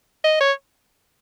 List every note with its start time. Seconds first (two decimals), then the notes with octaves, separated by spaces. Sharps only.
0.24 D#5
0.40 C#5